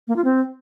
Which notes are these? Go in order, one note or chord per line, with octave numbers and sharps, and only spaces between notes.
A#3
F4
C4